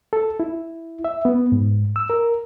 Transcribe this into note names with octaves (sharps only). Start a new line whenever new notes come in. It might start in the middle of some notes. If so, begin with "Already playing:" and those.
A4
E4
E5
B3
G#2
E6
A#4